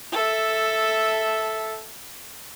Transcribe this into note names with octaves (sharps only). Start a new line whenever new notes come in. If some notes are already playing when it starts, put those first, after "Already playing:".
A4 E5